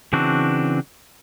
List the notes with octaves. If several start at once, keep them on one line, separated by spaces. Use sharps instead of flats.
C#3 E3 C4 D4 F#4